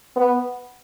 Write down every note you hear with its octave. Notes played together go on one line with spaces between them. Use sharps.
B3